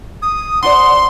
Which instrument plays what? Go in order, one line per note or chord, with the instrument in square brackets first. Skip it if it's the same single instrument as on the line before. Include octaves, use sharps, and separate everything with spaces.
[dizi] D#6
[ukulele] D4 C5 D5 [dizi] F#5 [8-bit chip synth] C6